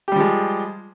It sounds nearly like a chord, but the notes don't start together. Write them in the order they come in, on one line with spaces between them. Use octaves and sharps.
G4 G3 F3 G#3